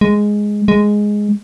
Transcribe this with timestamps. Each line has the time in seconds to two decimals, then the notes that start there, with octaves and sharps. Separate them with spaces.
0.01 G#3
0.68 G#3